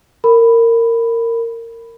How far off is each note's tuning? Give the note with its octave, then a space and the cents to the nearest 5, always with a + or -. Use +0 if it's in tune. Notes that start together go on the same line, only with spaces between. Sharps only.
A#4 -20 B5 +5